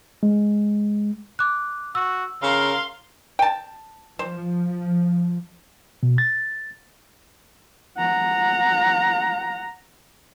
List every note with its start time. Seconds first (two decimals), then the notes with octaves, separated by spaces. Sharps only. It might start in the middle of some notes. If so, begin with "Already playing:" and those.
0.23 G#3
1.39 D6 F#6
1.95 F#4 E6
2.43 C#3 A#4 F5 C6
3.39 G5 A5
4.19 F3 C5
6.03 B2
6.18 A6
7.98 F#5 A#5